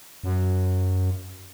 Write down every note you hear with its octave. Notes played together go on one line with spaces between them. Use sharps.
F#2